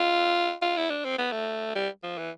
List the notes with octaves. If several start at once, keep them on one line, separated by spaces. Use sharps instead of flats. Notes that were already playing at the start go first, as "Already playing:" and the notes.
Already playing: F4
F4
E4
D4
C4
B3
A3
G3
F3
E3